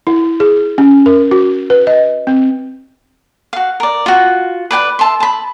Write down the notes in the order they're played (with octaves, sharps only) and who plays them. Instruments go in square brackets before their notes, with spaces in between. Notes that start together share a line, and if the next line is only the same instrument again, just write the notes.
[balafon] E4
G#4
C#4
A#4
F#4
B4
D#5
C4
[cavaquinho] F#4 F5
A#4 D5
F4 F#4
B4 D5 G5 B5
E5 A5 C6
A5 B5